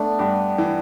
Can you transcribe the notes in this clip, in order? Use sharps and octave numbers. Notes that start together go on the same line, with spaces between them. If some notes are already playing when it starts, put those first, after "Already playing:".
Already playing: A3 B3 D4
G2 G4
E3